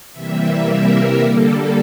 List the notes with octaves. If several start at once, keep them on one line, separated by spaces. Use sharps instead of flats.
C3 E3 G3 A#3 E5
A#4
D3 G3 A#3 A4